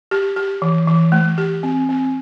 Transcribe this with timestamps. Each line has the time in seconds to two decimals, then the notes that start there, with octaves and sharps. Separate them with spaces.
0.11 G4
0.36 G4
0.62 E3
0.87 E3
1.12 A3
1.38 G4
1.63 C4
1.89 C4